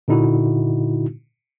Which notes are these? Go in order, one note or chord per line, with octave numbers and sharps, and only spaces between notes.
A#2 D3 D#4 E4 F#4